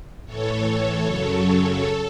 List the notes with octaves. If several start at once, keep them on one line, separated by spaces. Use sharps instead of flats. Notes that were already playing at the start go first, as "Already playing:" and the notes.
A2 E3 A4 C#5
F#2 C#3 F#3
A4